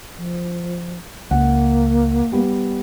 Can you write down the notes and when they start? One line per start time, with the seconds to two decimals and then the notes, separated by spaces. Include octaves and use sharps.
0.17 F3
1.31 C#2 A#3 F#5
2.32 G3 B3